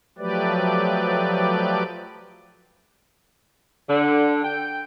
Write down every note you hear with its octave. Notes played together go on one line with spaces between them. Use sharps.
F3 F#3 A3 G4 B4 D5
D3
G5